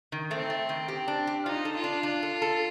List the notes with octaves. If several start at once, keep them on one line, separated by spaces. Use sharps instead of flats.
D#3
A3 C4
A3
D#3
G4
D4
G4
D#4 F4
A4
F4
D4
D4
A4
A4